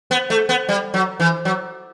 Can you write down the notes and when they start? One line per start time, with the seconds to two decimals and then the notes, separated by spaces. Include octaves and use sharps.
0.11 B3
0.30 A3
0.49 B3
0.69 G3
0.94 F#3
1.20 E3
1.45 F#3